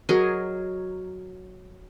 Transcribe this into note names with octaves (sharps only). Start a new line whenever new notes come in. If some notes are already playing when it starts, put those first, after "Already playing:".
F#3 G#4 A#4 D#5